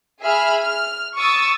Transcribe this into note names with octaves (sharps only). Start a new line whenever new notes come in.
G#4 E5 B5 F6
F6
C#6 D#6 E6 A6